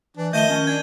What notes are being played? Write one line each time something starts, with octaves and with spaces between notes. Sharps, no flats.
E3 D4
D#3 F3 A3 D#5 A5 G6 D#7 G7
C#4
D4 G#6